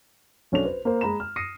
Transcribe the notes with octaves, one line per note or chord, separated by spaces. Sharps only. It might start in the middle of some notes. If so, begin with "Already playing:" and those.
B1 C#4 D4 A4 F7
B4 C5
A#3 A#4 C5
G#3 A#5 B5 E7
F6
D#6 A#6 C7 C#7 D#7